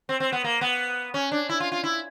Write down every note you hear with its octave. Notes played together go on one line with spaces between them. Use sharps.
C4
C4
B3
A#3
B3
C#4
D4
E4
F4
F4
E4